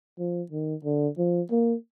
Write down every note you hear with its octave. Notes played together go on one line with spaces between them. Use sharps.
F3
D#3
D3
F3
A#3